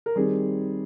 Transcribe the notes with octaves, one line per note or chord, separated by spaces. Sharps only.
A#4
D#3 G3 C4 D#4 G#4